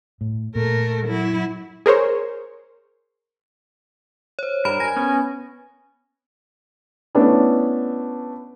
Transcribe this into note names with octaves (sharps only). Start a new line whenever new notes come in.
A2
A#2 A3 A#4
F#3 E4
G#4 A#4 C5 C#5
C5 C#5
G2 A#4 B5
G#5 A#6
B3 C#4
A3 B3 C#4 D4 E4